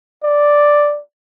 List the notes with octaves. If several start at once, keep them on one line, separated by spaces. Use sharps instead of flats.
D5